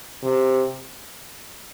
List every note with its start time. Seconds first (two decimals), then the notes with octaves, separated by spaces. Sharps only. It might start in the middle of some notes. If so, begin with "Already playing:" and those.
0.24 C3